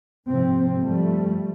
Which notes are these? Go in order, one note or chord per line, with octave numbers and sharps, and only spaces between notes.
G#2 C3 F3 C4
G2 F3 G3 A3